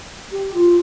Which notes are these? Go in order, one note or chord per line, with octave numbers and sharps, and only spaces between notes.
G4
F4